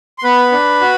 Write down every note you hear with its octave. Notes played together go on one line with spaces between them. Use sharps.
C6
B3 B4 B5
D4
F#4